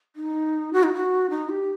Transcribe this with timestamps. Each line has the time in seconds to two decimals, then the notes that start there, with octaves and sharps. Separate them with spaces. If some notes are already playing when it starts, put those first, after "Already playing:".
0.16 D#4
0.73 F#4
0.83 D#4
0.94 F#4
1.30 D#4
1.49 G4